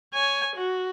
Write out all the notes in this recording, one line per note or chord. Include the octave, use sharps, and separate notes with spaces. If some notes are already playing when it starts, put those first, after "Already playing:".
C#5 G#5
F#4